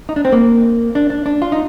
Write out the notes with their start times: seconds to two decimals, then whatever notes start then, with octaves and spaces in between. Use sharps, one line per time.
0.09 D#4
0.16 D4
0.25 C4
0.32 A#3
0.95 D4
1.10 D4
1.26 D4
1.42 F4
1.52 D#4